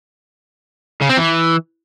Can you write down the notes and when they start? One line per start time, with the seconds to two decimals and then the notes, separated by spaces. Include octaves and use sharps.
1.01 C#3
1.10 C4
1.18 E3